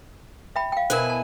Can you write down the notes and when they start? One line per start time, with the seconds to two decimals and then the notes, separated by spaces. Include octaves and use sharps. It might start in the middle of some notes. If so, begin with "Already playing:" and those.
0.56 E5 G5 B5
0.72 F5 G5
0.90 B2 E4 A#4 C5 G#5
1.10 A5